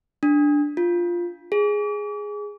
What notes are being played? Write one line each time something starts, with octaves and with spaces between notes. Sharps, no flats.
D4
F4
G#4